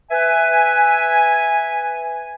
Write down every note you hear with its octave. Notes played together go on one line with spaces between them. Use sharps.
B4 E5 G#5